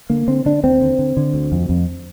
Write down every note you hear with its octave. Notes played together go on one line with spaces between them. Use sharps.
D3 A#3
D3 C4
D3 D4
D#2 C4
D3
D3
D3
D2
F2
F2